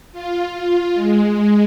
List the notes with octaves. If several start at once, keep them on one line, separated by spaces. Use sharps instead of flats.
F4
F4
G#3